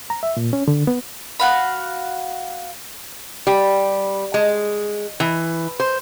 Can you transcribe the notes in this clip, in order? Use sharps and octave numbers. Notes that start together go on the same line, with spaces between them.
A#5
E5
A#2
C#4
D3
B3
F#4 F5 B5
G3
G#3
E3
C5